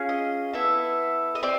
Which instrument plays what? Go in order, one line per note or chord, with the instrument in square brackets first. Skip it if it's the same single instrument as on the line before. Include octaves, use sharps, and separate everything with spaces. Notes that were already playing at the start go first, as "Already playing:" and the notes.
Already playing: [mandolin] C#4 F4 G#4
D#5
B3 E4 A4 E5
D#5
C4 D5